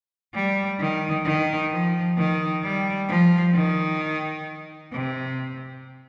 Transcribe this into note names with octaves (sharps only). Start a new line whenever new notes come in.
G3
D#3
D#3
F3
D#3
G3
F3
D#3
C3